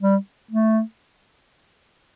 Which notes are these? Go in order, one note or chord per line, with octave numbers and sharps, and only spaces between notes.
G3
A3